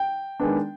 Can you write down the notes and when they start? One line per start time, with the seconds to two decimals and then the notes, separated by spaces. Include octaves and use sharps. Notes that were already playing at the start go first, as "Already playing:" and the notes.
Already playing: G5
0.40 D#3 G#3 B3 D4